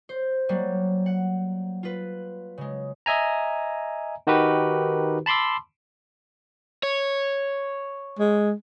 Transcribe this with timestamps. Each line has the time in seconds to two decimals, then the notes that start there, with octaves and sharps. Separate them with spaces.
0.09 C5
0.49 F#3 G3 A#3
1.06 F#5
1.83 F4 B4
2.58 C#3 G#3
3.06 D#5 E5 G#5 A#5
4.27 D#3 D#4 F#4 G4 A#4 B4
5.26 A5 B5 C6 D6 E6
6.83 C#5
8.19 G#3